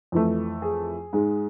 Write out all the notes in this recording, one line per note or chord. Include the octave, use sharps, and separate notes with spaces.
F2 E3 A3
G#4
G#2 G#3